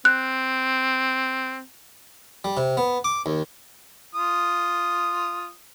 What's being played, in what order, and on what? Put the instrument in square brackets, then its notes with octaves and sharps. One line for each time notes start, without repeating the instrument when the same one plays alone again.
[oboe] C4 [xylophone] F#6
[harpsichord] G3
C3
B3
D6
D#2
[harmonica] F4 D#6